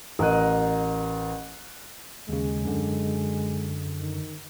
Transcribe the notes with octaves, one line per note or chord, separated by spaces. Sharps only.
A1 A#4 D#5 F#6 D#7
D#2 C#3 G#3
F#2 D3
D#3